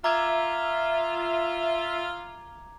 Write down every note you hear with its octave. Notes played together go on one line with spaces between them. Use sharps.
F4 E5 A#5 D6 G#6